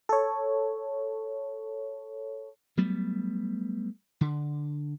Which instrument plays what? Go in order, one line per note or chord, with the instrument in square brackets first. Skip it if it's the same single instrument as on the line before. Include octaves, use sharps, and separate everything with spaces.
[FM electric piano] A4 C#5
[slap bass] F#3 G3 A3 B3
D3